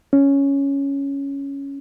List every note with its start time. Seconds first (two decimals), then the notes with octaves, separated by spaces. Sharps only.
0.13 C#4